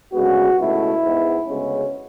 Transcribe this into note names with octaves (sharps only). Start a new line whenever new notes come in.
D2 C#3 G#3 B3 F#4
C#2 B2 A3 E4
G#2 G#3 B3
D2 C#3 G#3 B3 C#4